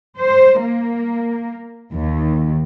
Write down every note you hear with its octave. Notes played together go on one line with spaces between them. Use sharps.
C5
A#3
D#2